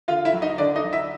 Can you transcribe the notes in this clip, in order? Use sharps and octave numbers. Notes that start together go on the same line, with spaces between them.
D3 F4 F5
E4 E5
F#3
D#4 D#5
D3 D4 D5
D#4 D#5
F#3
E4 E5